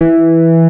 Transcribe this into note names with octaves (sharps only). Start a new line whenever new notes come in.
E3